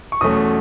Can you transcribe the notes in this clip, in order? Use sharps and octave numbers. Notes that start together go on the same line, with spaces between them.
C#6
E2 B2 F#3 A3 C#4 D#6